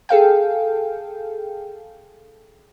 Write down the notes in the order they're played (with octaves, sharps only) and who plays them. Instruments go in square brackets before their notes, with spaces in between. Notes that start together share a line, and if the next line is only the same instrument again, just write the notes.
[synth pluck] G#4 A4 F5 G5